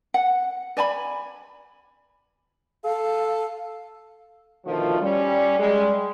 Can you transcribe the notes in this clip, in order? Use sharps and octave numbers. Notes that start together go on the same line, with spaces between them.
F#5
D5 G#5 A5 B5
A4 F5
B2 D3 D#3 F3 A3 F4
G3 C#4
G3 G#3